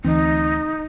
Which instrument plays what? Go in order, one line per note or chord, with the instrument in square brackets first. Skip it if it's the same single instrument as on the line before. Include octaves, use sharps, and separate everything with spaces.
[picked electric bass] D2 E3 C4 [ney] D#4